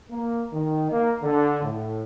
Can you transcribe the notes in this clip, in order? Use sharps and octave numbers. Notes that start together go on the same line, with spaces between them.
A#3
D#3
A#3
D3
A2